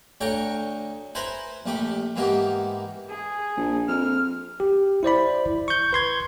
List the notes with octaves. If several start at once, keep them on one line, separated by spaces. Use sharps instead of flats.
D2 A4 C#5 G5 A#5 C#6
E4 B4 C5 G#5 A#5 B5
A#1 A3 G4 B5
G#2 E3 A#3 B3 G4
G#4
A#1
F2 F6
G4
E4 C5 D5 B5
C#6 G6
B4 C6 G#6